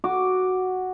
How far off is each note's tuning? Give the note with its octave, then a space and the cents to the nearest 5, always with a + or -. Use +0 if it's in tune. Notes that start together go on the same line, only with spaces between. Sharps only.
F#4 +0 D6 +0